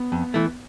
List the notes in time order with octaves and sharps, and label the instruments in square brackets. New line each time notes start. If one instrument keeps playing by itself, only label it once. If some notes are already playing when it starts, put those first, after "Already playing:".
Already playing: [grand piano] B3
[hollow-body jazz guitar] F2
E3 A3